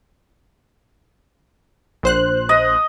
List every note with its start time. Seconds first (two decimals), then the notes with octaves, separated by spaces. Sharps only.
2.03 A#1 C5 F#6
2.49 D#5